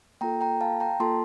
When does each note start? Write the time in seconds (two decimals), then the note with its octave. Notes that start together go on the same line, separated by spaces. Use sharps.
0.21 A#3 F4 A4 G5 A#5
0.41 G5 A#5
0.61 F5 A5
0.80 G5 A#5
1.00 A#3 F4 A4 A5 C6